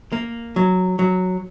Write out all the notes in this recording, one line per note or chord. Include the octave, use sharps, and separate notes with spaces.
A#3
F#3
F#3